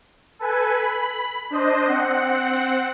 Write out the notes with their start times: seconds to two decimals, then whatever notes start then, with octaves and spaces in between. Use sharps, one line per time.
0.39 A4 B4 G#5
0.71 B5
1.50 D4 C5 D#5
1.87 C4 F#5